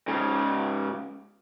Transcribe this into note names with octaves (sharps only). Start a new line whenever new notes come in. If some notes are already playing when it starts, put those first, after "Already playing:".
G#2 C#3